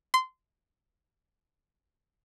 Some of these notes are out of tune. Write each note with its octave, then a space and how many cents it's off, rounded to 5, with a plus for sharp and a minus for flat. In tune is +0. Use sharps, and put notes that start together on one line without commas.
C6 -20